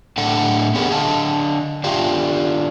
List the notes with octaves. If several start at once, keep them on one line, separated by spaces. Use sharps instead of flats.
A2 D4 A4 F#5 A5
B3 C#4 G4 G#4 A#4 F#5
D3 D#5 F5 A5
D4 F4 G4 F5